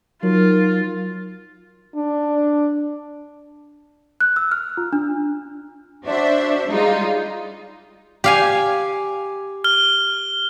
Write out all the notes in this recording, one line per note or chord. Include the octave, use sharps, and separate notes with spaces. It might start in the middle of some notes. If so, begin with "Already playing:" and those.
F#3 D#4 F4 A#4
D4
F#6
E6
F6
F4
D4
D4 F#4 C5 E5
G3 G#3 D#4 F4
G4 F5 G#5
F6 G7